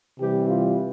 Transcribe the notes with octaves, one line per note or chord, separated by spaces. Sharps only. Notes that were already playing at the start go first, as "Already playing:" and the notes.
C3 E3 G3 G4
F4